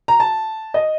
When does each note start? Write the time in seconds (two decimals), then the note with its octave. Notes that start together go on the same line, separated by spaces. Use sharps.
0.08 A#5
0.20 A5
0.74 D#5